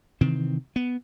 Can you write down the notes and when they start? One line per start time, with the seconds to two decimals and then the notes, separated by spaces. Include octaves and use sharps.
0.21 C3 D#3 E3 C4
0.76 B3